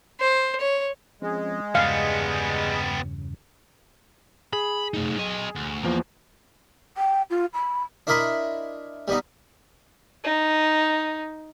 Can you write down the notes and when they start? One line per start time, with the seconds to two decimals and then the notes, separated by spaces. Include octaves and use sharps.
0.20 C5
0.61 C#5
1.22 F3 G#3 C4 C#4
1.75 E2 G2 C#3 G3 B3 F5
4.53 G#4 B5
4.94 A3 D#4
5.18 F#3 D#5
5.56 D2
5.84 E2 F3 A#3
6.97 G5
7.30 F4
7.54 B5
8.07 D4 E4 A#4 D#5 B5 C6
9.08 G3 B3 D#4
10.24 D#4